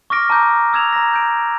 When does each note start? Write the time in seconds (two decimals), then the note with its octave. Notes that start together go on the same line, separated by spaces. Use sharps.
0.10 C#6 D6 F6 A#6 D7
0.30 A5 A#5 D6 E6 G6
0.73 D#6 E6 G#6 E7 F7
0.93 A#5 A#6
1.13 G6 D7